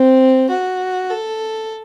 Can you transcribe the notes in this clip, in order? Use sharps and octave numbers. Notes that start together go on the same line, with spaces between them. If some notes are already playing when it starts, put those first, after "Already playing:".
Already playing: C4
F#4
A4